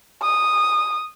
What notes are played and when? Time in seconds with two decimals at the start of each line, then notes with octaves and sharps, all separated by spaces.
0.22 D#6